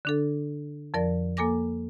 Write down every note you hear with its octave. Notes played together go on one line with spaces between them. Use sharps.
D3 D4 A4
F2 F3 A#4 D5
A#3 A4 G#5 D6 A#6